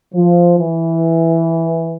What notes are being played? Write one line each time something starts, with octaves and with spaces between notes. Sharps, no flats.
F3
E3